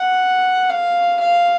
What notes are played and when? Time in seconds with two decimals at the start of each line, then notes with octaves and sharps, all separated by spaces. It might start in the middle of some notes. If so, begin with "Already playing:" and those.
Already playing: F#5
0.69 F5
1.20 F5